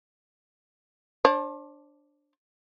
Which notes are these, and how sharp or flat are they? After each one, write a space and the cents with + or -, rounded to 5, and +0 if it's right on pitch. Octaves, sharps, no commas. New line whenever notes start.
D4 +0 C5 +40